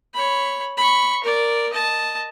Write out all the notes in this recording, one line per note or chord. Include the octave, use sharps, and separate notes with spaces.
C#5 B5
B5 C#6
A#4 D5
D#5 A5